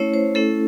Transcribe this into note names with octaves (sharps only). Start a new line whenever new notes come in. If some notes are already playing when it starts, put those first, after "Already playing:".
Already playing: A3 C#4 E4 C#5
C5
A3 C#4 E4 A4